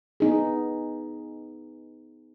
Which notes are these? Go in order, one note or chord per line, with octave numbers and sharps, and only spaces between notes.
B3 D#4 G#4